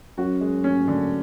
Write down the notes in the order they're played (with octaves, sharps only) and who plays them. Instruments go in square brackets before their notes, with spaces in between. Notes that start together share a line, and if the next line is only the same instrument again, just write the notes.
[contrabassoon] F#2 [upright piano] F#4
[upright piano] G#3
C#4
D3